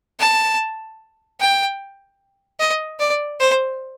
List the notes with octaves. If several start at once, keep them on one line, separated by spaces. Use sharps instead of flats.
A5
G5
D#5
D5
C5